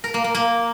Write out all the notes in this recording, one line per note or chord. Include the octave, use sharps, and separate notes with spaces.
A#4
A#3
A#3
A#3